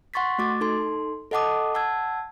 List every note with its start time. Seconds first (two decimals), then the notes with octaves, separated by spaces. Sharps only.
0.14 F#5 C6 C#6 A6 B6
0.38 A3 F#4 D6 A6
0.61 D#4 A4 C6
1.31 A4 D#5 F#5 A5 D6 D#6
1.75 F#5 A5 E6 G#6